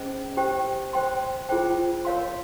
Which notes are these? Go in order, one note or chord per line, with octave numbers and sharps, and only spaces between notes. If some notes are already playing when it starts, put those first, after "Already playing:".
Already playing: C#4 G#4 C5 D#5
G4 C5 G5
C5 G5 C6
F4 G#4 C5 G5
A#4 C#5 F5 C6